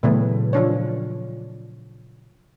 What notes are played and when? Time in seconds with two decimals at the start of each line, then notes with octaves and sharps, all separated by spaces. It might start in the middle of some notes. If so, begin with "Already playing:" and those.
0.03 A#2 C#3 E3 F#3 A3 B3
0.53 F3 D4 C#5